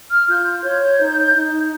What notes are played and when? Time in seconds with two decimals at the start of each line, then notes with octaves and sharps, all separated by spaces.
0.10 F6
0.28 F4 G6
0.64 C#5 G6
0.99 D#4
1.35 D#4